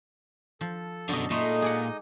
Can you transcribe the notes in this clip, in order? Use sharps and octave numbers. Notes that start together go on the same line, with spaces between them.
F3 A4
F#2 B2 D3 D#5
A#2 G#3 A3 D#4 D#5
G#4 D5 F#5